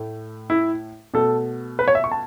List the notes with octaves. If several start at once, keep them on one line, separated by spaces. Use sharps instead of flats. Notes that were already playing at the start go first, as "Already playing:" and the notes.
Already playing: A2 A3
E4
B2 A3 A4
B4
C#5
E5
C#6
A5